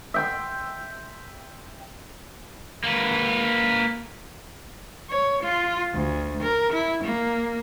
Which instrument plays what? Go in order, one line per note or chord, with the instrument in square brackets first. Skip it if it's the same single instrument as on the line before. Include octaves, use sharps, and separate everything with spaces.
[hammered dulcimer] E5 G5 C6
[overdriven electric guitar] A#3 B4
[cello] C#5
F4
D2
A#4
E4
A#3